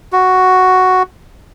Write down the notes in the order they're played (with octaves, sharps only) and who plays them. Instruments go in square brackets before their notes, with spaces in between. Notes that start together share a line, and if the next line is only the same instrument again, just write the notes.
[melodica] F#4